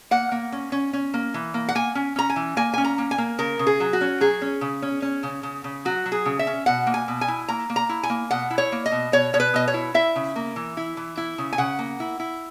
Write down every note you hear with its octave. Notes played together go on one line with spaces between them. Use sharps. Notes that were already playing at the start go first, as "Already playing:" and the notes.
A#3 F#5
A#3
C#4
C#4
C#4
A#3
E3
A#3
F#5
A#3 G#5
C#4
C#4 A#5
G#5
E3
A#3 G#5
C#4 G#5
A#5
A#3
G#5
A#3
C#3 A#4
C#3
G#4
F#3
F#4
C#4
F#3 G#4
C#4
C#3
C#4
C#4
C#3
C#3
C#3
F#3 F#4
F#3
G#4
C#3
E5
C#4
B2 F#5
A#3
G#5
B2
G#5
E4
A#3 A#5
A#3
A#5
E4
G#5
A#3
B2 F#5
E4
C#5
A#3
D#5
B2
B2 C#5
B2 C#5
B4
B2 D#5
C#5
E4
E4 E5
C#3
A#3
E3
E4
E3
E4
C#3
G#5
C#3 F#5
A#3
E4
E4